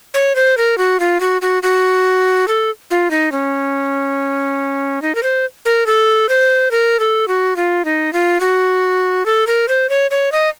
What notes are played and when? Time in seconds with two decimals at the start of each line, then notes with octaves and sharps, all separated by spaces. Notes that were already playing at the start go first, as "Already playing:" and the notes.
0.14 C#5
0.36 C5
0.57 A#4
0.78 F#4
1.00 F4
1.20 F#4
1.42 F#4
1.63 F#4
2.48 A4
2.91 F4
3.11 D#4
3.32 C#4
5.02 D#4
5.15 A#4
5.23 C5
5.65 A#4
5.86 A4
6.29 C5
6.71 A#4
7.00 A4
7.28 F#4
7.56 F4
7.85 D#4
8.13 F4
8.40 F#4
9.26 A4
9.47 A#4
9.68 C5
9.89 C#5
10.11 C#5
10.32 D#5